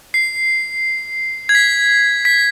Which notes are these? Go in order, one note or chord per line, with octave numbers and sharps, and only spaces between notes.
C7
G#6
B6
B6